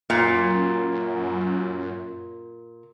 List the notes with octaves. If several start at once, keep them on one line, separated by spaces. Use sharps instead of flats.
F#2 A#2